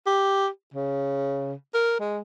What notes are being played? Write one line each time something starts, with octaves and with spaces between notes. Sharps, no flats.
G4
C#3
A#4
G#3